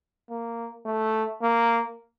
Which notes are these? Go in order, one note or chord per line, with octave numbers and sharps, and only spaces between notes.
A#3
A3
A#3